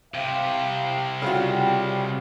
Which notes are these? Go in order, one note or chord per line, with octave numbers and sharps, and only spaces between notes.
C2 C3 F5
C#3 G3 F4 F#4